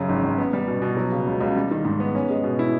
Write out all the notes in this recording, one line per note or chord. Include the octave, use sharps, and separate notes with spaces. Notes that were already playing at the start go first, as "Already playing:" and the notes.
Already playing: F#2 C#3
G#1
G#1
B3
G3
B2
B2
F#3
C#3
C#2
C#2
G3
D#3
G#2
B3
C#4
G#3
B2
E4